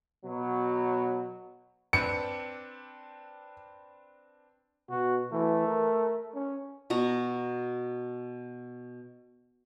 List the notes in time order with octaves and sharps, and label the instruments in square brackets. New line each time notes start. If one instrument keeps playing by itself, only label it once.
[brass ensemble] B2 F#3
[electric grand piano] C4 D4 B4 [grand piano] C#7
[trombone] B2 [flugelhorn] F#4
[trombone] E3 [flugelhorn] A3
[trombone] A#4
C#4
[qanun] B2 F#4 A#5